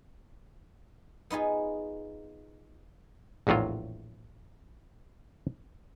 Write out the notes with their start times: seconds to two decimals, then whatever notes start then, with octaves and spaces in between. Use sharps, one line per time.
1.30 B3 D#4 F4 G#4
3.47 A#1 E2 A2 F#3 F4